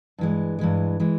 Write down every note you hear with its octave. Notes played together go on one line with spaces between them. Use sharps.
G2 E3 G#3
G2 E3 G#3
E3 G#3